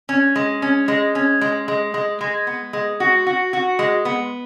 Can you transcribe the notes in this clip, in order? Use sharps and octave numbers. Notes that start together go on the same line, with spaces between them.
C#4
G#3
C#4
G#3
C#4
G#3
G#3
G#3
G#3
B3
G#3
F#4
F#4
F#4
G#3
B3